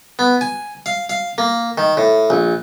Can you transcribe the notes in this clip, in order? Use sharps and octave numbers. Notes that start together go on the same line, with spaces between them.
B3
G#5
F5
F5
A#3
D#3
A2
A#1